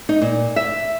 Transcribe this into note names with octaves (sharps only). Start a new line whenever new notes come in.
D#4
A#2
E5